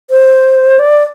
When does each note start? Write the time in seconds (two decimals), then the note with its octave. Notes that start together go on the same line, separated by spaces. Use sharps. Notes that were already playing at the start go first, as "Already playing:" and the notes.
0.10 C5
0.79 D5